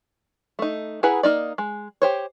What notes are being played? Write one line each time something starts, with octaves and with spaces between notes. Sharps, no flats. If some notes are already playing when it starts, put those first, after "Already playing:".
A3 D#4
E4 G#4 B4 F#5 A#5
A#3 D#4 D5
G#3
G4 C5 C#5